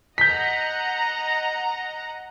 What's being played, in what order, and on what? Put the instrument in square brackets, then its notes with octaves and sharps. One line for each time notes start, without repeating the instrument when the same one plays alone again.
[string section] D#5 F#5 A#5 [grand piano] G6 B6